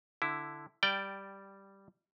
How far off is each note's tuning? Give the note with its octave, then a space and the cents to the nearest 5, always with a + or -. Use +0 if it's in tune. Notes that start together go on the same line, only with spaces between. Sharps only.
D3 +0 E4 +0
G3 +0 D5 +0 G5 -10